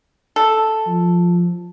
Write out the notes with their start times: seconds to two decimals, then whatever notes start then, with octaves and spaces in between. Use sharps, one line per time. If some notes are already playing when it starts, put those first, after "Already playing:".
0.36 A4
0.87 F3